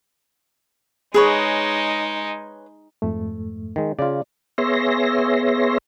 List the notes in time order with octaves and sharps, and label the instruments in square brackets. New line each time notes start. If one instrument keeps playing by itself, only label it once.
[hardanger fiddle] G#3 D#4 [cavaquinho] G#4 B4 C#5
[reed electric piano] F2 G#2 A3
[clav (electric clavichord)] D#3 G#3
[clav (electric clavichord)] C#3 F4 [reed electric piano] D5
[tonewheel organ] B3 G#4 C#5 E5 C6 A#6